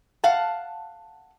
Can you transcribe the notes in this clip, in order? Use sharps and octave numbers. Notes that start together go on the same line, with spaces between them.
F5 F#5 A5